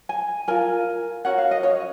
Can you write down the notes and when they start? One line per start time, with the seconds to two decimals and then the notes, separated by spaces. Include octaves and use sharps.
0.09 G#5
0.48 F4 A#4 G#5
1.25 C#4 F#4 A#4 F#5
1.38 F5
1.51 D#5
1.63 C#5